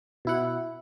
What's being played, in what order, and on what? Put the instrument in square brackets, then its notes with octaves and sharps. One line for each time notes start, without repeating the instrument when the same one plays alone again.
[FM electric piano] B2 E4 F#5